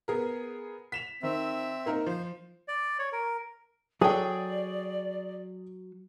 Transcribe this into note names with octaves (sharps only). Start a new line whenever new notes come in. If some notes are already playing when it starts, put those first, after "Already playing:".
B3 G#4 A#4
B6 E7 F7
D#3 C4 E5
A#3 D#4 A#4
F3 C5
D5
C#5
A#4
F#3 G#4 A4 D5 G5